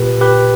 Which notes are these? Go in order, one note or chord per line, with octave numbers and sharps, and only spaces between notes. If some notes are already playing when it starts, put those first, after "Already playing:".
Already playing: A#2 G4 B4
G4 B4